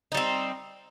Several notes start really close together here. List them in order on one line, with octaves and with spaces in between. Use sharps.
D#4 G3 C4